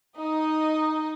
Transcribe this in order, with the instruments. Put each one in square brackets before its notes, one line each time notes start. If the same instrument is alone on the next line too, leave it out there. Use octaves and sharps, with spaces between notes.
[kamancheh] D#4 D#5